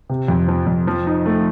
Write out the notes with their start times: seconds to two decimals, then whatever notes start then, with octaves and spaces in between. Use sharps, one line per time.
0.09 C3
0.28 F2
0.48 F3
0.67 F2
0.87 F3
1.06 D#4
1.26 A3